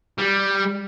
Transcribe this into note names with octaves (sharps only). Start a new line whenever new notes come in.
G3